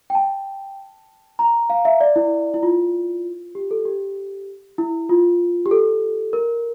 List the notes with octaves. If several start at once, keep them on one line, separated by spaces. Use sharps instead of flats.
G5
A5
A#5
F5
E5
D5
E4
E4
F4
G4
A4
G4
E4
F4
G4
A4
A#4